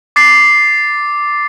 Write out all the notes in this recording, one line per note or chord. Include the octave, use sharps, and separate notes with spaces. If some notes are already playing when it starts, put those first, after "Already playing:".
D6 A6 C7